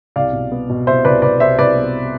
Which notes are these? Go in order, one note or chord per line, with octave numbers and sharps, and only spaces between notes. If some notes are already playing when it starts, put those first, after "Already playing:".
C2 D5 F5
B2
B3
B2
C2 C5 E5
C2 B4 D5
C2 B4 D5
C2 C5 E5
C2 B4 D5
B3